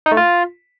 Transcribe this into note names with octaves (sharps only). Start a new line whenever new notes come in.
D#4
A3
F4